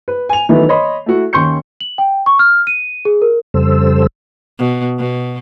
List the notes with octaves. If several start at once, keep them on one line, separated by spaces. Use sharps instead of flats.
B4
G#5 F7
D#3 E3 F#3 A3 B3
C#5 D#5 B5 C6
A3 E4 F#4
D#2 C#4 C6 C#6 G6 C#7
F#7
G5
C#6
F6
D#7
G#4
A#4
F2 C#3 G3 A4 C5 E6
B2
B2